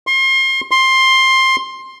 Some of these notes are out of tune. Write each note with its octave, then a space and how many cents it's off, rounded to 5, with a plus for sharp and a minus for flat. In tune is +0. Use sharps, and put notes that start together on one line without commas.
C6 +35
C6 +15